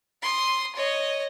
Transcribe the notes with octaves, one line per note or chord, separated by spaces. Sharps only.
C6 D#6
C#5 D#5